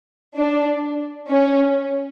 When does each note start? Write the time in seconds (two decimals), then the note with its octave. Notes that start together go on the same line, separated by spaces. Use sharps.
0.37 D4
1.30 C#4